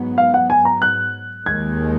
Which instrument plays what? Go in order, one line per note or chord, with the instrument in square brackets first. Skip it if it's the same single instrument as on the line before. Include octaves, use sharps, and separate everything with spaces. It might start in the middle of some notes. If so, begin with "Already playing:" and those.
Already playing: [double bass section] G#2 F#3 B3
[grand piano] F5
F#5
G#5
A#5
F#6
[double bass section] D#2 D#3 G#3 [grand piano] G#6